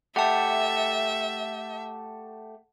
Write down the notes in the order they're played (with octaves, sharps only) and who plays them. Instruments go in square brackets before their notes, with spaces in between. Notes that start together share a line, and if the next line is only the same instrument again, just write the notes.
[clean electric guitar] A3 G4 [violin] E5 [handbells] F#5 A5